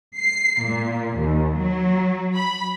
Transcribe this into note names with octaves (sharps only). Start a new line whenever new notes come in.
C7
A#2
D#2
F#3
B5